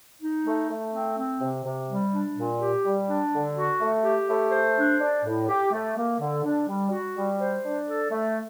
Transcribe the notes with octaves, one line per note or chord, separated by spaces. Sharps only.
D#4
A3
A3
C4
C4
C3
C3
G3
D4
A#2
G4
G3
D4
D3
F#4
A3
G4
A3
C5
D4
D4
A2
G4
A3
A#3
D3
D4
G3
F#4
G3
C5
D4
A4
A3